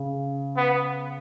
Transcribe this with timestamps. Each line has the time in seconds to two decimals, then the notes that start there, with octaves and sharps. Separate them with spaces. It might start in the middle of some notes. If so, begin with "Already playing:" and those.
Already playing: C#3
0.57 B3